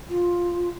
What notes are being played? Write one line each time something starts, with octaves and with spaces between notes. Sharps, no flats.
F4